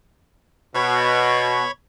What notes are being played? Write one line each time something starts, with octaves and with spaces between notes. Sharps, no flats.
B2 C#5 B5 C#6